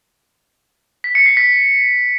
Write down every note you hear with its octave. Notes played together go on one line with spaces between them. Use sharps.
B6
C#7
C7
B6